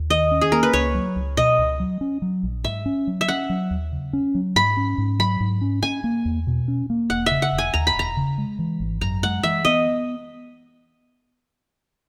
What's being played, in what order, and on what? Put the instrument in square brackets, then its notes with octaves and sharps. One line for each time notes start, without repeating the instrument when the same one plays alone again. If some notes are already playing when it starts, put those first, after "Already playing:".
Already playing: [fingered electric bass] D#2
[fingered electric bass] D#3 [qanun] D#5
[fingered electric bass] C#4
[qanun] G#4
[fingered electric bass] A#3 [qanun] A#4
[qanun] B4
[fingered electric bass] C#2 [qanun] C#5
[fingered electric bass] F#3
C#2
[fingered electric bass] B2 [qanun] D#5
[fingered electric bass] C#2
F#3
C#4
F#3
A#1
[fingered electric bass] G#2 [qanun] E5
[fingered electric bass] C#4
F#3
[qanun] E5
[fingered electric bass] C#4 [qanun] F#5
[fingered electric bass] F#3
D#2
C#3
C#4
F#3
[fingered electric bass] G#2 [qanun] B5
[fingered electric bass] C#4
G#2
[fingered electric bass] F#3 [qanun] B5
[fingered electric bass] G#2
C#4
[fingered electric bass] C#4 [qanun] G#5
[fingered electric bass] A#3
E2
B2
C#4
A#3
[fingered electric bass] E1 [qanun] F#5
[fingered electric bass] C#3 [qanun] E5
[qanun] F#5
[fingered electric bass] E1
[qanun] G#5
[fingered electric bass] D#2 [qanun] A#5
[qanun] B5
[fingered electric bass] E1 [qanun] A#5
[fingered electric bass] C#3
G#3
E3
G#1
[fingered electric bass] F#2 [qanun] A#5
[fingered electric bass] G#3 [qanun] F#5
[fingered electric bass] E3 [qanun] E5
[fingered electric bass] B3 [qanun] D#5